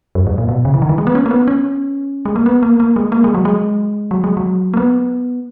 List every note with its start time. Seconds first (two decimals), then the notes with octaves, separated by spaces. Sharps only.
0.15 F#2
0.27 G#2
0.38 A#2
0.49 B2
0.65 C#3
0.74 E3
0.82 D#3
0.89 E3
0.98 G#3
1.07 B3
1.15 C#4
1.26 A#3
1.31 B3
1.48 C#4
2.25 G#3
2.36 A#3
2.46 B3
2.63 A#3
2.80 A#3
2.96 G#3
3.12 A#3
3.24 G#3
3.35 F#3
3.45 G#3
4.11 F#3
4.24 G#3
4.37 F#3
4.74 A#3
4.77 B3